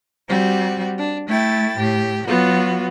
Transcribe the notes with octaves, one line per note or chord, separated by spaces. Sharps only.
G3 C4 F#4
D4
A3 E4 G5 A6
A2 G4
F#3 B3 F4 F#4